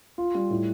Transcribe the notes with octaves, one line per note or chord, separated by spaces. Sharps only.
F4
G3
A2